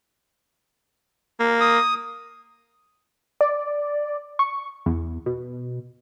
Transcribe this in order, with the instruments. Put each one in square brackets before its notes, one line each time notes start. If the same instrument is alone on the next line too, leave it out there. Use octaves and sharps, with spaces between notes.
[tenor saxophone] A#3
[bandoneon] D#6
[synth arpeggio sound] D5
C#6
E2
B2